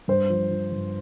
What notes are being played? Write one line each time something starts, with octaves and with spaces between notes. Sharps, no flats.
G2 C5
F3
F3
G2